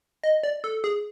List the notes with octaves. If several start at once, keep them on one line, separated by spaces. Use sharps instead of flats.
D#5
D5
A4
G#4